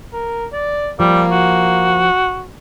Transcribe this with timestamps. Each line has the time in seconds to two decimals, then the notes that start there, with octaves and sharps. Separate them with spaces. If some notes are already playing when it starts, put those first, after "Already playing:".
0.13 A#4
0.53 D5
1.00 F3 G3 A#3
1.32 F#4